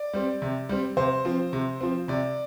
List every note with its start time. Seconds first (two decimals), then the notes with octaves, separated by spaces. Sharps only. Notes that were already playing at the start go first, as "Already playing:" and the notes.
Already playing: D5
0.13 G3 C4
0.42 C3
0.69 G3 C4
0.97 C3 C5
1.25 F3 C4
1.53 C3
1.81 F3 C4
2.08 C3 D5